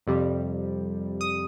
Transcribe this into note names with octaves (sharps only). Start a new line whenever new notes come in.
F2 C3 G3
D#6